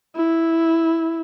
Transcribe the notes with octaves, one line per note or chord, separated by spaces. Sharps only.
E4